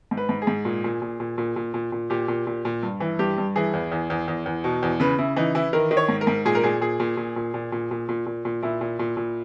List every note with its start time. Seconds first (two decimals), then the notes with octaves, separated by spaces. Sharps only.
0.11 G#2
0.17 B4
0.29 G#2
0.42 G#4
0.47 G#2
0.65 A#2
0.84 A#2
1.02 A#2
1.20 A#2
1.38 A#2
1.56 A#2
1.74 A#2
1.92 A#2
2.10 A#2 G4
2.28 A#2
2.47 A#2
2.65 A#2
2.83 G2
3.00 E3
3.19 G2 G4
3.38 G2
3.56 E3 G#4
3.73 E2
3.92 E2
4.10 E2
4.28 E2
4.46 E2
4.64 B2
4.82 E2
5.00 C#3 B4
5.18 C#3 E4
5.36 E3 D#4
5.55 E3 E4
5.73 D#3 A#4
5.91 D#3
5.97 C#5
6.08 G#2
6.21 A#4
6.27 G#2
6.45 A#2 G#4
6.55 A#4
6.63 A#2 G#4
6.81 A#2 G#4
7.00 A#2
7.17 A#2
7.36 A#2
7.54 A#2
7.72 A#2
7.91 A#2
8.09 A#2
8.26 A#2
8.45 A#2
8.62 A#2 E4
8.81 A#2
8.99 A#2
9.17 A#2